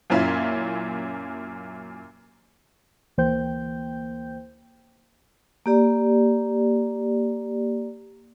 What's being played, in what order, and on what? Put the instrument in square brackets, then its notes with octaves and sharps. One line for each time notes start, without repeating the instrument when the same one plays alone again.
[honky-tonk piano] F#2 A#2 C#4 E4 F4
[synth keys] D2 E3 A#3 C5 G5 G6
[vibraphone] A#3 G4 D5